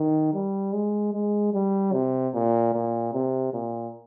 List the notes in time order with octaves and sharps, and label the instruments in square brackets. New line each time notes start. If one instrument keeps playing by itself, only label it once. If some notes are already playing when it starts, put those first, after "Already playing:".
Already playing: [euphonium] D#3
G3
G#3
G#3
G3
C3
A#2
A#2
C3
A#2